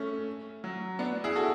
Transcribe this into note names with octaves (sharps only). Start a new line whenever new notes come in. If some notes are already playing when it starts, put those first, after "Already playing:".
Already playing: A3 C#4
F#3
B3 D4
E4 G#4
F#4 A4